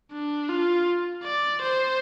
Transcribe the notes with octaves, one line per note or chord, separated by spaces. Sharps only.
D4
F4
D5
C5